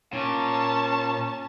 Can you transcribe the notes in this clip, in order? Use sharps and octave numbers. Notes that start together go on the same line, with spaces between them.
A#2 C#4 A5